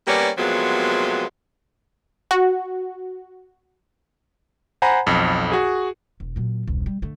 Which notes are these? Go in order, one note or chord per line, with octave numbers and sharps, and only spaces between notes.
G3 A#3 B3 C#4 C#5 D5
C3 F3 F#3 G#3 A#3 B3
F#4
C5 F#5 G#5 A#5 B5
B1 F2
F#4 G#4
E1
A#2 F#3
E1 C2
G3
D3 A3